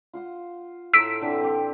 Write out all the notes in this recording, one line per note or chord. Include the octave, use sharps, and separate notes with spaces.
F4 C5 F#5
A2 C5 A#5 E6 B6 D7
D3 E3 C4
C4 G4